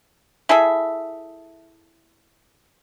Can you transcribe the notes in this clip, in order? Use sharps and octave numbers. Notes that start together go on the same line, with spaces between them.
E4 G#4 A4 E5